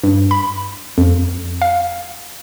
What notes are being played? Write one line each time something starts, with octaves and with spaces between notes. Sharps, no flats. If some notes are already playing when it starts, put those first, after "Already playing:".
G2
B5
F2
F5